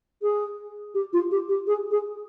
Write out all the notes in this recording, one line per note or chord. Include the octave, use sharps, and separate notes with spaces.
G#4
G4
F4
G4
G4
G#4
G#4